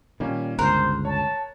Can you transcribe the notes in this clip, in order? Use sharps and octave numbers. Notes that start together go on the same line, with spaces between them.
A#2 D#3 G3 A#3 C#4
G1 C#2 A#4 C5 F#6
C#5 A5